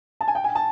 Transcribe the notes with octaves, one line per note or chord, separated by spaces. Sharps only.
A5
G#5
G5
G#5
A5